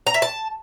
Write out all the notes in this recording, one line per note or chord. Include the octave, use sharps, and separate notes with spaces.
A#5
E5
A5